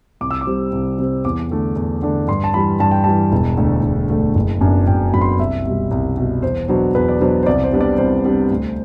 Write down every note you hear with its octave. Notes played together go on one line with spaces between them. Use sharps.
C2 D6
E6
D6
C3 G3 C4
C2
C3 G3 C4
E2 D6
D3 A3 D4
E2
D3 A3 D4
G2 C6
A5
E3 G3 B5
G2 A5
G5
E3 G3 A5
E1
D2 D3 A3
E1
D2 D3 A3
F#1
F#2 F#3 B3 D4
F#1 G5
F#2 F#3 B3 D4 B5
C6
B5
C2 E5
B2 G3
C2
B2 G3
E2 C5
B2 F#3 B3 D4 C5
E2 B4
D5
B2 F#3 B3 D4 C5
C5
C2 D5
C5
C3 G3 B3 D4
D5
C2 C5
C3 G3 B3 D4
D2